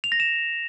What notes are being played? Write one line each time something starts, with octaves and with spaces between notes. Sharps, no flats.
F7
A#6
E7